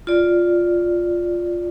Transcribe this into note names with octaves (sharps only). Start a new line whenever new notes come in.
F4 D5